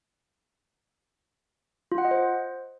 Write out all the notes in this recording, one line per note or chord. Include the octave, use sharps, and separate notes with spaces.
F4
F#5
D#5
C5